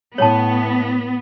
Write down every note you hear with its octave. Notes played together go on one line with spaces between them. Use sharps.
A2 B3 C#5 A5